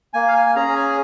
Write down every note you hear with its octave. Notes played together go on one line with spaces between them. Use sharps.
A#3 G#5
F5
G#5
C#4 G#4 A#5
G#5